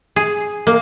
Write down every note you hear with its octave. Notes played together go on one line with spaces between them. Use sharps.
G#4
A#3